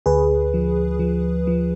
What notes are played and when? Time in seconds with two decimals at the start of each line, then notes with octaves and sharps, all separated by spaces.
0.06 D2 G#4 B4
0.54 F3
0.99 F3
1.47 F3